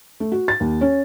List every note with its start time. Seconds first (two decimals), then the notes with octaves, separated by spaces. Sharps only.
0.20 A3
0.32 F#4
0.48 A6
0.60 D#2
0.81 C#4